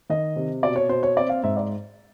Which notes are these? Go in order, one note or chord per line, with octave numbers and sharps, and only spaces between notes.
D#3 D#5
C3
B2 D5
C#5
B2 C5
C#5
C4 D5
F5
G#2 E5
D5